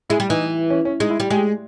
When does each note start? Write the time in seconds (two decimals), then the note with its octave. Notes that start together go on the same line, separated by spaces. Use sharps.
0.10 G#3 E4
0.20 G3
0.29 E3 D#4
0.70 C#4
0.85 C#4
1.00 G#3 D#4
1.10 E4
1.20 G3 G4
1.30 G#3 G4